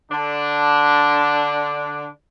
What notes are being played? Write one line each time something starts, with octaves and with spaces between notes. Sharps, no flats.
D3 D4